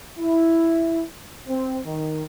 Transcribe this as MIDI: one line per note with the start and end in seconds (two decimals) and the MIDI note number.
0.19 1.04 64
1.48 1.79 60
1.85 2.23 51